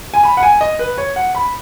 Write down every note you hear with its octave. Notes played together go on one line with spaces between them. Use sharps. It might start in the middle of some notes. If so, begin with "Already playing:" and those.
G#5
B5
F#5
G#5
D#5
B4
C#5
F#5
B5